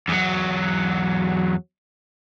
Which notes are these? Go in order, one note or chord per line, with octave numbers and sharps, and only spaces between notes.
E2 F#3